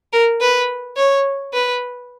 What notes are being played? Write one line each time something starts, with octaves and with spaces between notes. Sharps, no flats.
A#4
B4
C#5
B4